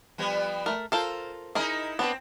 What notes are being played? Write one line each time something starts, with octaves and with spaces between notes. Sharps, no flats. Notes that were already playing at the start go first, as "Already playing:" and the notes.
F3 G3 B3
A3 A#4
F4 A4 A#4 C5
D#4 E4 G#4 A#4 D#5
B3 C4 D4 B4